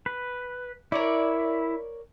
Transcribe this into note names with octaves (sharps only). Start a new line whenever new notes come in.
B4
E4 A#4 C#5 D5